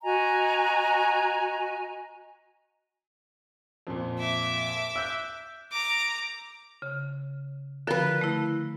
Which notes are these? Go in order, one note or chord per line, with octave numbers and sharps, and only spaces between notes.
F#4 D#5 G#5 A#5
F2 A#2
E5 D6
E6 F#6 G6
A#5 D6
C#3
D3 F3 A#4 B4
A3 E4